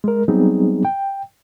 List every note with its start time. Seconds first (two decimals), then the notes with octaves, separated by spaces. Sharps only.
0.04 G#3 A#4
0.28 F#3 G3 B3 C4 D#4 G#4
0.85 G5